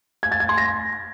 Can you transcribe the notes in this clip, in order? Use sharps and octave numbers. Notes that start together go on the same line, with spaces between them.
G#6
A6
G#6
C6
A#6